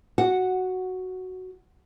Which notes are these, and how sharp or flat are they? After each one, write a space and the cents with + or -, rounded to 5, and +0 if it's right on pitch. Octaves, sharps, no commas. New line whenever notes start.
F#4 +5 F#5 -5